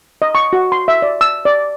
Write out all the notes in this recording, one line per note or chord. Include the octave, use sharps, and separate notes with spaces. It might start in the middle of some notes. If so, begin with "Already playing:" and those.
D#5
C#6
F#4
C6
E5
D5
E6
D5